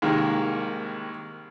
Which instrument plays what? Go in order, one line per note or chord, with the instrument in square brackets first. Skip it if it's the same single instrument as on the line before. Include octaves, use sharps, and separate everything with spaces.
[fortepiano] C2 D#3 G#3 A#3